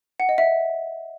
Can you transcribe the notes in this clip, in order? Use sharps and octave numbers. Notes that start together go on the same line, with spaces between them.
F#5
D#5
E5